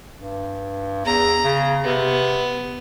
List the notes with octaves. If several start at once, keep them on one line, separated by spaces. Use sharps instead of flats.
G2
E2 A#5
C#3
C3 B3